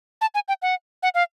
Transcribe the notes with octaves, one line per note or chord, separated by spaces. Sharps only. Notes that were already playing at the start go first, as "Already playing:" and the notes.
A5
G#5
G5
F#5
F#5
F5